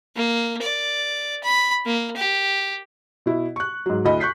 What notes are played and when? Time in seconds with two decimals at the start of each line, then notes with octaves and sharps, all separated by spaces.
0.16 A#3
0.62 D5
1.43 B5
1.86 A#3
2.16 G4
3.26 B2 E4
3.56 C#6 F#6
3.86 G#2 F#3
4.05 D2 E4 D#5 B5
4.20 C#6 F#6 G6 B6 C7